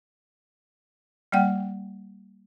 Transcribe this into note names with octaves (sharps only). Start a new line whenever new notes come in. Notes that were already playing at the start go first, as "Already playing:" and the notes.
G3 A#3 D5 F#5 G5